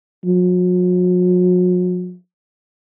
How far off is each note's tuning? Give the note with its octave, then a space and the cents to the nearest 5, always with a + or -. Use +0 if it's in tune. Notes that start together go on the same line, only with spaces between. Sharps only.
F#3 -45